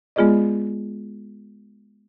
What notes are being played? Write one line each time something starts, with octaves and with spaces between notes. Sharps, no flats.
G#3 B3 F4 G#4 D5 D#5